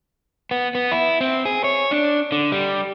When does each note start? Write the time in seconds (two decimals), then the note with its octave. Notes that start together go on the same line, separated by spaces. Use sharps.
0.51 B3
0.75 B3
0.92 E4
1.21 C4
1.45 G#4
1.64 C#5
1.91 D4
2.32 D3
2.52 G3